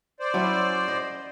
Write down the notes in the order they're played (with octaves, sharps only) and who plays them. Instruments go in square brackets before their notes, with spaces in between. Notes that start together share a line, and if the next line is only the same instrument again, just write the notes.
[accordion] C5 D5
[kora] F#3 C#4 E4
D#5